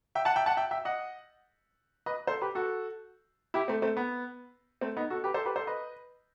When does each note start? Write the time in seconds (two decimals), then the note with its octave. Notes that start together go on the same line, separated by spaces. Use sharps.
0.15 E5 G5
0.25 F#5 A5
0.36 E5 G5
0.46 F#5 A5
0.57 E5 G5
0.71 E5 G5
0.85 D#5 F#5
2.06 B4 D#5
2.27 A4 C5
2.41 G4 B4
2.55 F#4 A4
3.54 E4 G4
3.68 A3 C4
3.82 A3 C4
3.97 B3
4.81 A3 C4
4.97 B3 D#4
5.10 F#4 A4
5.24 G4 B4
5.34 A4 C5
5.45 G4 B4
5.56 A4 C5
5.67 B4 D#5